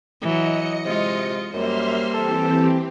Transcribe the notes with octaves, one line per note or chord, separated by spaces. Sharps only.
E3 F#3 D#5 C#7
C3 G#3 F4
F#2 G3 A#3 C5 E5 C6 F6
E3 C4 G4 A4